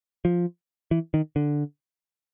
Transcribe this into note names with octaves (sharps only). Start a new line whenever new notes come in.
F3
E3
D#3
D3